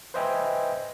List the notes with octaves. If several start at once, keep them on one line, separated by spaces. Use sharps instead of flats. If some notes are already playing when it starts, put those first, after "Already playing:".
B4 C5 D#5 E5 G5 G#5